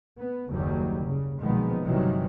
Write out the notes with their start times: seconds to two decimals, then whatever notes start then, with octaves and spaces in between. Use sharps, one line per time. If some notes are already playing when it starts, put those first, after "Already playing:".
0.17 B3
0.48 F#1 D#2 D#3 F#3 G3
1.05 C#3
1.41 B1 A#2 D#3 F3 G#3 B3
1.85 G1 C3 D#3 E3 F#3 G3